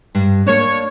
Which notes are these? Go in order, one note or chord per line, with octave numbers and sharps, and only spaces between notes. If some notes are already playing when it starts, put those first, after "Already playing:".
G2
A#3 D4 C#5